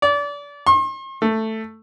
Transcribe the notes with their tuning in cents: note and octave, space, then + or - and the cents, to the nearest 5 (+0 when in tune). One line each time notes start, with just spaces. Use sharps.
D5 -30
C6 +45
A3 +5